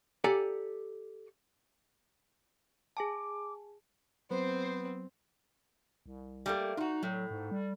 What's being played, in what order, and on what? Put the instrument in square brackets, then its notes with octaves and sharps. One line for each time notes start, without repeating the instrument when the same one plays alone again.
[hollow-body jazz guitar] G4 A4 D5 F#5 G#5 A#5
[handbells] G#4 G#5 A5 [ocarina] D6
[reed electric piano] F#3 [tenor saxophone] B3 [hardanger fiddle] C4 [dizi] C5
[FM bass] C2
[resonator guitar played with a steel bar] G3 A3 A#3
[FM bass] D#4 [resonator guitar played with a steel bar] F4 F#4
[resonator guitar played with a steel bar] A2 [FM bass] F#3
[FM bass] G#2
G3